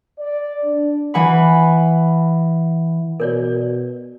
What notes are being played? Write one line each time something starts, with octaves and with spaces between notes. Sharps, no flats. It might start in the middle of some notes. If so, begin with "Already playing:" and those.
D5
D4
E3 F#5 G#5 B5
B2 A#4 C#5 D5